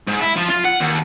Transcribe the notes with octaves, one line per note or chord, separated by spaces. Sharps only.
G#2
E4
F3
F4
F#5
D#2